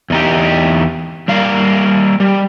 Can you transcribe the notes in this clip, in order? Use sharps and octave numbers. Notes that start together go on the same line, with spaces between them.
E2 D#4 G4
G3 A#3 F5
G3